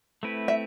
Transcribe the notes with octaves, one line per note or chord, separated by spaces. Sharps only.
A3 C4 E4 B4
E5